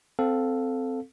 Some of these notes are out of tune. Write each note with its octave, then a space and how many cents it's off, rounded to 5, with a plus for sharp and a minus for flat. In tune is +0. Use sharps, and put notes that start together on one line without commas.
C4 -10 A4 +0 F5 +10